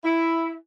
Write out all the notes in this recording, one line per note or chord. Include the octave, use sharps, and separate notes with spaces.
E4